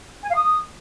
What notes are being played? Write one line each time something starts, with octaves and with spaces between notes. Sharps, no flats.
G#5
F5
D#6